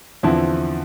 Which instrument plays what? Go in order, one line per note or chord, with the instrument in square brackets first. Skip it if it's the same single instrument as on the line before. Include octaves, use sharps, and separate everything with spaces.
[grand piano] E2 D3 F3 C4 E4